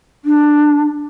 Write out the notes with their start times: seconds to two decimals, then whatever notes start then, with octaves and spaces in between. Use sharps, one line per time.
0.24 D4